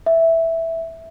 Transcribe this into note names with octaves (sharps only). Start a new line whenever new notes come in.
E5